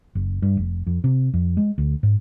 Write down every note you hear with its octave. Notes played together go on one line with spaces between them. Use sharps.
F#1
G2
F1
F2
C3
F2
G#3
D2
G#2